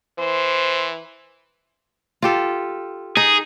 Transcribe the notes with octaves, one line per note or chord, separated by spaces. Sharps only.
E3 C5
F4 G4 A4
D#4 G#4